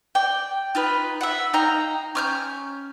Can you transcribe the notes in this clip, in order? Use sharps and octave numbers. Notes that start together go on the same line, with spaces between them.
D5 G5
D#4 F4 B4
E5 F#5
D#4 F5 G5 A#5
C#4 F6 G6